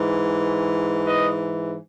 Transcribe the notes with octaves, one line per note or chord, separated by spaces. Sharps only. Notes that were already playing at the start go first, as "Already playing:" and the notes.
Already playing: G#2 E3
B4 D#5